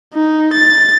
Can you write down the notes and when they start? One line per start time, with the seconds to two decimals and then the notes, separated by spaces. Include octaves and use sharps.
0.14 D#4
0.53 A6